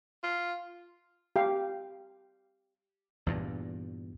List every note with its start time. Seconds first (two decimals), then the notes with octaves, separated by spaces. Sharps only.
0.23 F4
1.36 G4 F5
3.26 E2 G2 A#2